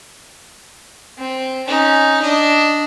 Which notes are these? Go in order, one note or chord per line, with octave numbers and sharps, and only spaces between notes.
C4
C#4 D#4
D4 D#5